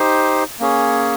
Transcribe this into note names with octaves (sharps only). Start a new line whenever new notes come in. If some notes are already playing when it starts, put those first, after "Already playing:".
Already playing: D#4 G4 C5
A#3 C#4 G#4 C#5